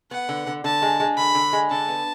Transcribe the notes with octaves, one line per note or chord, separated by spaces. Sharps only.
B3 F#5
D3
D3
D3 A5
G#3
G#3
D3 B5
D3
G#3
D3 A5
B3